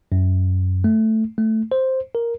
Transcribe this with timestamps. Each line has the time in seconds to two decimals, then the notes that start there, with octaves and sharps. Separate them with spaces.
0.12 F#2
0.84 A3
1.38 A3
1.72 C5
2.15 A#4